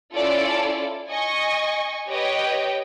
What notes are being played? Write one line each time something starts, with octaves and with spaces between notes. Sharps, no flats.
C#4 E4 F4 A4 D5
D#5 G#5 C#6
G4 B4 C#5 D#5 G5